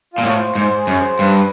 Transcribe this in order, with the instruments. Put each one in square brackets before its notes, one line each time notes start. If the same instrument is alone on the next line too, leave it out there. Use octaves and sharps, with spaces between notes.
[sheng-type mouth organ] F4
[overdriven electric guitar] A#2
A2
[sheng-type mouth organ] C5
[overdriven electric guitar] G#2 [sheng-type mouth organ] C5
[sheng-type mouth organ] G#4
[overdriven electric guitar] F#2
[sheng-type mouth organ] C5
[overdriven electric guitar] G2 [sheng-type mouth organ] B4